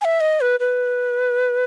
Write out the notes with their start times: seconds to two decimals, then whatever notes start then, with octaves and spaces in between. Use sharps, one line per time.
0.01 G#5
0.05 E5
0.21 D#5
0.41 B4
0.60 B4